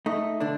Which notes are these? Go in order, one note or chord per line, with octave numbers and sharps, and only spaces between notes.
A3 D#4
D3 D4